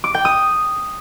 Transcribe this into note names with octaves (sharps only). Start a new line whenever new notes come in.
D6
G5
D#6